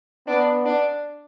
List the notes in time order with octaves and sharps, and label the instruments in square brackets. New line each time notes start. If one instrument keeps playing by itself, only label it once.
[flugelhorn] B3 [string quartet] D4
[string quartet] D4